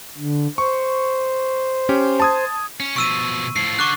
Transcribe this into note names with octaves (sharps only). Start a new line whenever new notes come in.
D3
C5 C#6
C#4 G4
A5 D#6 G#6
C#4
B2 F3 C#6 E6 D#7
A2 F3 C7
D3 C#6 D6 F#6